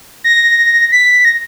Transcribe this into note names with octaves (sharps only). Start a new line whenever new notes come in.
A#6
B6
A#6